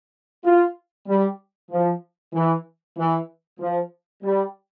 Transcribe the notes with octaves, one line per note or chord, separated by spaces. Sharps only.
F4
G3
F3
E3
E3
F3
G3